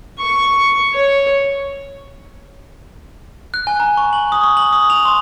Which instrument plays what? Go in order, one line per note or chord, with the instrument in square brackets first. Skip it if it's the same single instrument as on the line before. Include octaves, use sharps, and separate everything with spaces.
[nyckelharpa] C#6
C#5
[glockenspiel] F#6
G#5
A#5
C#6
F#7
D#6
C#6
F#7
D#6
F7
C6